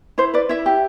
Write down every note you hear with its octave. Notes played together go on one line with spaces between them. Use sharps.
E4 C5
B4 D5
E4 E5
G4